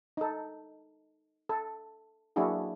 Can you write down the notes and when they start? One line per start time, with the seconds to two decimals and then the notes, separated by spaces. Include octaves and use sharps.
0.17 D#4 A4
1.49 A4
2.36 F#3 A#3 D4 E4 F#4 G#4